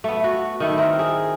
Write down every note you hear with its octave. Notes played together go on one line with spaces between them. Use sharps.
A3 B3
F#4
D#3 A3 E4
C4 A#4
G#4